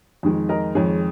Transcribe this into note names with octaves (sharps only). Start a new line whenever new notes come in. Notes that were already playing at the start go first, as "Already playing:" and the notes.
F2 D#3 G#3
A#4 D#5
F2 D#3 G#3 G#4 C#5